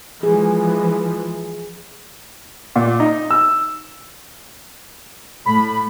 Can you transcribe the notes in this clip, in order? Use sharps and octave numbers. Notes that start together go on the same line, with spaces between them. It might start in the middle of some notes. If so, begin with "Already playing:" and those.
E3 F3 G#3 G#4
A#2
D#4
E6
A2 B5